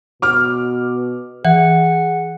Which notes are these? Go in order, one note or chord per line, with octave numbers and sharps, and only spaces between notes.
B2 D6 F6
E3 G#4 F#5